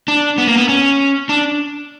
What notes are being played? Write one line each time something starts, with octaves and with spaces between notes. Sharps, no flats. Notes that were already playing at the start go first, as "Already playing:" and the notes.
D4
B3
A#3
B3
C#4
D4